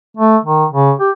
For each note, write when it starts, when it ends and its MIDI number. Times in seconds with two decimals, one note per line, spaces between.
0.17 0.37 57
0.44 0.65 51
0.72 0.92 49
1.00 1.11 67